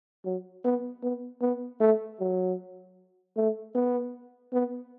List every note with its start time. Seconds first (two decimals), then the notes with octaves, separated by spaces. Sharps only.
0.25 F#3
0.64 B3
1.03 B3
1.42 B3
1.80 A3
2.20 F#3
3.37 A3
3.75 B3
4.53 B3